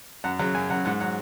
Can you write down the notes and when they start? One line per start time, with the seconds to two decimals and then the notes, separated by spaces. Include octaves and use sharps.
0.24 F#2 F#5
0.39 C#3 F#3 F#5
0.55 F#2 G#5
0.70 C#3 F#3 F#5
0.85 G#2 F#5
1.00 F#3 F#5